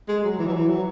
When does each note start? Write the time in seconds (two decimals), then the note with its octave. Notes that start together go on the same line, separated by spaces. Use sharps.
0.08 G#3
0.24 F#3
0.39 E3
0.47 F#3
0.53 E3
0.69 F#3